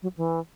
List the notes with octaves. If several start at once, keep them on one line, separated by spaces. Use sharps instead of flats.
F#3
E3